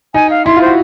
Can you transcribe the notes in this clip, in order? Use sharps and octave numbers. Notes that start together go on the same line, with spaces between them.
D#4 G#5
F5
E4 C6
F4
C5
F#4